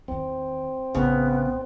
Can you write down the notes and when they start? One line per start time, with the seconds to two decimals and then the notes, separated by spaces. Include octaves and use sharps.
0.08 E2 D#3 C4
0.95 A#1 A2 C#3 B3